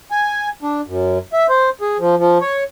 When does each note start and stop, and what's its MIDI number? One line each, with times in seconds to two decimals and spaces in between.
0.11 0.49 80
0.63 0.81 62
0.87 1.18 42
1.33 1.46 76
1.49 1.70 72
1.81 1.97 68
1.99 2.15 53
2.18 2.38 53
2.41 2.64 73